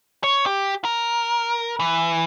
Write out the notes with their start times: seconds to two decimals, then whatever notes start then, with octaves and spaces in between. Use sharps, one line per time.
0.24 C#5
0.46 G4
0.85 A#4
1.80 E3